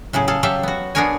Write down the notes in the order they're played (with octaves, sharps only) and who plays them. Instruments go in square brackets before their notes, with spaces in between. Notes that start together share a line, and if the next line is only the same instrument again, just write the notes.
[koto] A2 C#3 F#3 G#4
G#4 A4 F5
F#3 G4 A4 E5 F5
B3 F#4
B3 D4 G#4 A#4 C#5 G#5